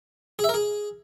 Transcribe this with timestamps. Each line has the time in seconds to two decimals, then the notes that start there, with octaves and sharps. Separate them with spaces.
0.39 G#4
0.44 E5
0.49 A#4
0.54 G#4